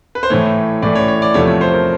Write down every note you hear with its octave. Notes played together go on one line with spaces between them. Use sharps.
B4
C5
A2 E3 A3 C#5
A2 E3 A3 D5
C#5
C#5
D5
E2 C3 F3 A3 C#5
C#5
C5
A#4